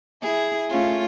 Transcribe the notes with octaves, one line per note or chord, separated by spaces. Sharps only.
E4 G#4
A3 C#4 F4